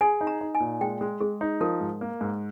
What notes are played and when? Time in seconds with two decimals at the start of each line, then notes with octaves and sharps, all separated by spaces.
0.01 G#4 G#5
0.21 D#4
0.27 A#5
0.41 D#4
0.55 G#5
0.60 A#2
0.81 G#3 G5
1.01 G#3
1.20 G#3 G#4
1.41 D#4
1.61 F3 A#4
1.81 G#2
2.01 A#3
2.21 G#2